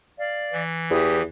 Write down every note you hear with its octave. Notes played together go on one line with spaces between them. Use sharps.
D5 F5
E3
E2 E4 G4 D#6